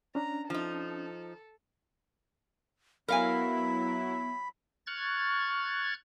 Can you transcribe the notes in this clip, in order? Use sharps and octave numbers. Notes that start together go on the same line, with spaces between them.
C#4 D4 A#5
F3 D#4 A4
F#3 B3 E4 A#4 F5 G#5 B5
C#6 F6 F#6 G#6 A6